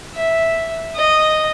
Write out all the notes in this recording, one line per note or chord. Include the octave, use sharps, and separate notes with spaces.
E5
D#5